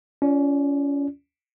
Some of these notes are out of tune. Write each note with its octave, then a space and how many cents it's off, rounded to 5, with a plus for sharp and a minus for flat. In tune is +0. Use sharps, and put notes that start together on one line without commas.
C#4 +25 F4 -20 D5 +0